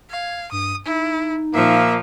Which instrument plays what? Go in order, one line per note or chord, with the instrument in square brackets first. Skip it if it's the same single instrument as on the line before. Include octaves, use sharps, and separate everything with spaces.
[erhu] F5 [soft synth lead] G#6
[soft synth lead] G2 [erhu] D#6
[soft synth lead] D#4 [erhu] E4
[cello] A#2 F3 [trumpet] A#3 [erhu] E5